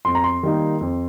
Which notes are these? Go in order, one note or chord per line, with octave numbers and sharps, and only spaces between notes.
F2 C6
A#5
C6
D#3 G3 A#3 D#4
F2